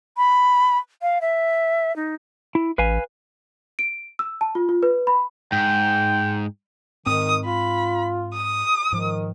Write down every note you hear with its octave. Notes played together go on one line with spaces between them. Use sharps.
B5
F5
E5
D#4
E4
A1 B4 F5 G#5
D7
E6
A5
F4
F4
B4
B5
G#2 G5
G#2 D#3 C4 D#6
F4 B5
D#6
G#2 D#3 F3